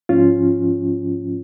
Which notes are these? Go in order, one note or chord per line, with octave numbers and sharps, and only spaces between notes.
G#2 F3 C#4 F4